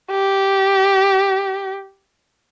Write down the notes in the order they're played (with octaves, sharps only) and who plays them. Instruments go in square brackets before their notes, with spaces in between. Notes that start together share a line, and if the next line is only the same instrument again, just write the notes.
[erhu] G4